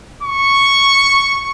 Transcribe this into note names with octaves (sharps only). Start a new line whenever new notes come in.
C#6